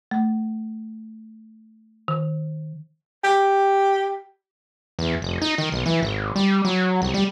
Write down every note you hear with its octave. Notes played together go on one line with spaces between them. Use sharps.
A3
D#3
G4
E2
F1
D#4
D#3
B1
E3
G#1
G3
F#3
C2
G3